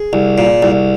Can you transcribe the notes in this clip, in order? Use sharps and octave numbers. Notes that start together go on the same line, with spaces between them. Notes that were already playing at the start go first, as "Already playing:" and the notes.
Already playing: G#4
C2
A#2
C2